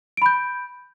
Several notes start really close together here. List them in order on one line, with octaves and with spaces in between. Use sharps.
D7 B5 G6